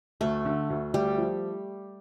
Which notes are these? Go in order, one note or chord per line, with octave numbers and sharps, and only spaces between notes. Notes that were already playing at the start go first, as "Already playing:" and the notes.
D2 A3
D3
D2
D2 G3
F3